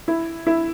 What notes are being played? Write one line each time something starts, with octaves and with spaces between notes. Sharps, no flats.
E4
E4